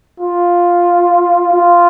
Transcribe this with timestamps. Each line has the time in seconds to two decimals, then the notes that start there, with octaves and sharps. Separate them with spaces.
0.20 F4
1.53 F4